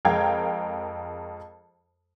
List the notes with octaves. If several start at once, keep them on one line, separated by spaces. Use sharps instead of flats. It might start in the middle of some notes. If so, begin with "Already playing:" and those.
F2 G#3 A#4 F5 G5 G#6